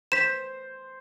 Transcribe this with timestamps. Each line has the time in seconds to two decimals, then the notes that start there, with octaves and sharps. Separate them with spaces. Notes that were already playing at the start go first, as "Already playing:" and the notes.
0.12 C5 B6 E7